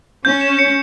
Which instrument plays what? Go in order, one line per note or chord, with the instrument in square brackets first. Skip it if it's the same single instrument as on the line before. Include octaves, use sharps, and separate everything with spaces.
[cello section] C#4 [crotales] G6
[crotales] E7
C#7